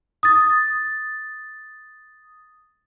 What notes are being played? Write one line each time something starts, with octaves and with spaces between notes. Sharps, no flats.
D#6 A6